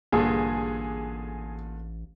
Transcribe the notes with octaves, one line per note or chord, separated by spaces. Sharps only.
A1 G2 A#2 D3 G#4